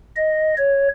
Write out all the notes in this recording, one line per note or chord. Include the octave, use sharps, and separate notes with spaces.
D#5
C#5